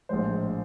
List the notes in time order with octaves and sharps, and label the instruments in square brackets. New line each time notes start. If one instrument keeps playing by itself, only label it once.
[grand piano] A#1 A2 F3 G#3 C5